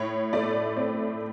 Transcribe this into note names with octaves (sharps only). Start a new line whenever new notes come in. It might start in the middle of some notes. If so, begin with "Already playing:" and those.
Already playing: A2 C#5
A3 D5
C4